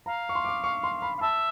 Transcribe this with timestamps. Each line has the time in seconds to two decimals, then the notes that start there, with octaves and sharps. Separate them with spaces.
0.06 F5 A#5
0.29 C#6
0.35 C6
0.45 D6
0.49 C#6
0.64 C#6
0.84 C6
1.02 B5
1.17 F5
1.21 E5 A5